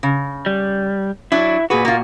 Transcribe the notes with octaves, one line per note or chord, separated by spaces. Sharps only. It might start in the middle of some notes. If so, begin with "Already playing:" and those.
C#3
G3
F#3 D4 E4
A#2 F#4 G#4 B4
A#3 F4